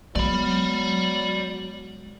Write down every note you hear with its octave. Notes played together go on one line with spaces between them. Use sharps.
F#3 G#3 B3 D5 B5